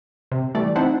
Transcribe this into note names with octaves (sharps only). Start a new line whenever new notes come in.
C3
E3 G3 A3 D5
C4 D#4 E4 C5 F#5 A5